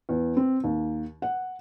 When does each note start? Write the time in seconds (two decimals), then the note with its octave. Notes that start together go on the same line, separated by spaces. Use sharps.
0.09 E2
0.37 C4
0.64 D#2
1.22 F#5